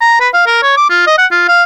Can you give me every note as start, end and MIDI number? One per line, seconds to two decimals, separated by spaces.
0.01 0.16 82
0.20 0.29 71
0.34 0.45 77
0.47 0.61 70
0.63 0.74 73
0.77 0.87 86
0.90 1.06 65
1.07 1.15 75
1.18 1.26 78
1.32 1.48 65
1.48 1.64 77